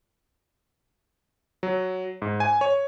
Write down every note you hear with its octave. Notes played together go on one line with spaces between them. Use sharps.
F#3
G#2
G#5
C#5